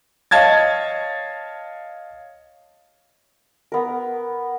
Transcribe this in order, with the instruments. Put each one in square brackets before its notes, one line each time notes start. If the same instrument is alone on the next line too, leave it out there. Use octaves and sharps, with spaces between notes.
[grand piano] C#5 D#5 F5 A5 G#6 A6
[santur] B3 A#4